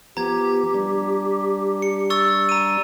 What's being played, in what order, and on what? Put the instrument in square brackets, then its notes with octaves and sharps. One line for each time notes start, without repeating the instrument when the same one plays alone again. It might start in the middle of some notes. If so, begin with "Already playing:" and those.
[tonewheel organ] F3 B3 [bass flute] G4 [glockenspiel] A#5 G#6
[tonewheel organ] G3 D4
[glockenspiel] C#7
C#6 E6 A6
A#5 D#7